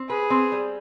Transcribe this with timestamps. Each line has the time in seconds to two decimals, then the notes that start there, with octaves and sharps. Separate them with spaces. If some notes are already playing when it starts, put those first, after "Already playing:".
Already playing: C4
0.10 G#4 B4
0.30 C4
0.52 G3